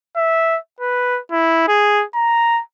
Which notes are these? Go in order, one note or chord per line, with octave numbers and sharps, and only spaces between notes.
E5
B4
E4
G#4
A#5